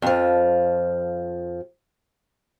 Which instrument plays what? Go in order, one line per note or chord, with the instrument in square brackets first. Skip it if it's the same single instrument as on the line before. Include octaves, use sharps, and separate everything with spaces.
[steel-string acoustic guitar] F2 F3